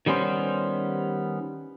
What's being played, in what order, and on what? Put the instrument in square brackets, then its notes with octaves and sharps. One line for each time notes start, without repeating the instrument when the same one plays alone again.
[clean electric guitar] D#3 G3 B3 C#4 C5